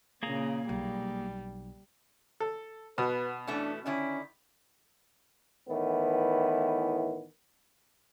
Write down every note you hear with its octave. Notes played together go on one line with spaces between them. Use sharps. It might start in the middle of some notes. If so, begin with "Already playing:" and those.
A#2 C#3 A#3 G#4 A#5
B1 G3
A4
B2 B3 B4
E3 A3 C#4 D4
D3 D#3 C#4 E4
A2 D#3 E3 B3